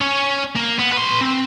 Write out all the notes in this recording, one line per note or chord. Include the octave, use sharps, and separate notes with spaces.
C#4 C#5
A#3
B3
B4 C6
C4